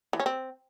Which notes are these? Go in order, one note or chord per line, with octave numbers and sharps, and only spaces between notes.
E3
C#4
C4